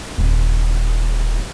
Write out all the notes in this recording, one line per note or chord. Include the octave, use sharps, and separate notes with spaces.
D#1